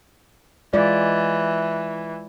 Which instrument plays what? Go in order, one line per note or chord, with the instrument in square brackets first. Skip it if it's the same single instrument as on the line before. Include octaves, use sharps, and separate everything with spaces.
[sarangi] E3 [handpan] G#3 F4 D5